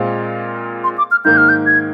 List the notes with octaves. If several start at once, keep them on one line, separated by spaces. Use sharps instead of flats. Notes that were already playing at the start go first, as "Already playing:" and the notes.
Already playing: A#2 G#3 C4 F4
C6
D6
F6
G#2 D#3 A#3 G6
F6
G6
G#6